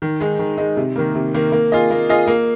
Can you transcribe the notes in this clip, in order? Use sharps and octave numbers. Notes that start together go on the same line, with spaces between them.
D#3
G#3 D#4
D#3
G#3 D#4
C3
D#3 A#3
C3
D#3 A#3
A#3
F4 G#4 D#5
A#3
F4 G#4 D#5
A#3